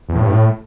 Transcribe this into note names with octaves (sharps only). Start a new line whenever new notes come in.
E2
A2
G2
A2